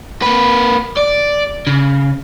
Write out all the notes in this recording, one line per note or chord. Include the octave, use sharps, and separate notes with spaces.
A#3 B4
D5
C#3